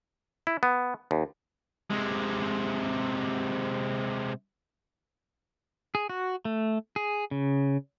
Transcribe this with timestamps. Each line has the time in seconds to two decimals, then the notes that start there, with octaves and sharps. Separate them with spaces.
0.47 E4
0.63 B3
1.11 D#2
1.91 C3 G#3
5.95 G#4
6.10 F#4
6.45 A3
6.96 G#4
7.31 C#3